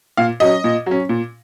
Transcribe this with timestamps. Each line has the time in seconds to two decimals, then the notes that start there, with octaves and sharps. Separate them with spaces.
0.17 A#2 F5
0.40 F#3 C#4 D#5
0.64 A#2
0.86 F#3 C#4
1.09 A#2